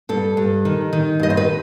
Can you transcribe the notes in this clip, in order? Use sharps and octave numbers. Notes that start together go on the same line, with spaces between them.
G2 A4
G2
D#3
D#3
G2 D#5
C5
B4